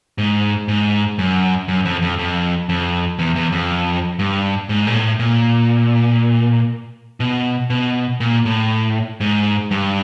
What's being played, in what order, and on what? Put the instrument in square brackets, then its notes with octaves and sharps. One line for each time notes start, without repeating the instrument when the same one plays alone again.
[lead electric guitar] G#2
G#2
F#2
F#2
F2
F2
F2
F2
E2
E2
F2
G2
G#2
A#2
A2
A#2
B2
B2
A#2
A2
G#2
G2